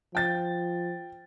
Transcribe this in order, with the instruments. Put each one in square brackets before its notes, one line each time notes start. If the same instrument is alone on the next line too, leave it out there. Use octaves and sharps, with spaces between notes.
[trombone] F3 [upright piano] G5 A6